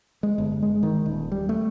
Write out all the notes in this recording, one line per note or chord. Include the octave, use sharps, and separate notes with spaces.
G#3
G1
G#3
D#3
D#1
G3
A3